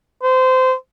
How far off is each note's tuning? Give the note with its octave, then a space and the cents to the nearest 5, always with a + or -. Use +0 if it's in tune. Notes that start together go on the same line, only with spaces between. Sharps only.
C5 -25